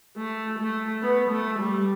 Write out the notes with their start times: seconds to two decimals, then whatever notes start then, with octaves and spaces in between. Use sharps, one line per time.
0.17 A3
0.59 A3
1.03 B3
1.31 A3
1.60 G3